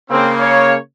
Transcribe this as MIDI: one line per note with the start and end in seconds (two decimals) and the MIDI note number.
0.10 0.76 49
0.10 0.76 58
0.10 0.29 60
0.40 0.73 73